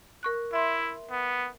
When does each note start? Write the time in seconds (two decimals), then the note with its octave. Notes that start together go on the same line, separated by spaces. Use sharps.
0.23 A#4 C#6 F#6
0.53 E4 E5 C6
1.11 B3